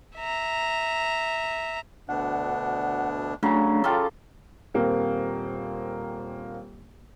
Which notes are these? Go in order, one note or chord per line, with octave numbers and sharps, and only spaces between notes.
E5 A#5
D2 B2 D4 F#5
C#3 F#3 A3 D4
F4 G4 A4
D#1 A#3 C4